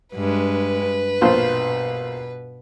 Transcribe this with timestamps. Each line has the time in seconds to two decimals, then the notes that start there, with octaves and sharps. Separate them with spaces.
0.15 G2 G#3 B4
1.21 A#1 B2 F4 C5